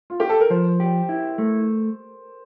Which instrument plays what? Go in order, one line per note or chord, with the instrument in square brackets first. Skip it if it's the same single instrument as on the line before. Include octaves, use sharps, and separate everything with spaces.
[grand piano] F4
G4
A4
A#4
[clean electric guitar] F3 [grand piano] C5
[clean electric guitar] G4
E4
A3